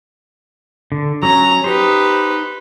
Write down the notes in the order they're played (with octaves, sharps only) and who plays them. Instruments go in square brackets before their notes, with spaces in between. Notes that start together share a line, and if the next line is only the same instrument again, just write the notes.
[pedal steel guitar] D3
[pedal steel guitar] F#3 C#4 [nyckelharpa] A#5
[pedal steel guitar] D#4 C5 [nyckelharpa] G4 B4